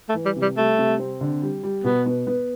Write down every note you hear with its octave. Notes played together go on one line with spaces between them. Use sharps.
A3
E3
G3
C3
G3
G3 A3
C3
C4
D3
G3
G3
B2 B3
B3
B3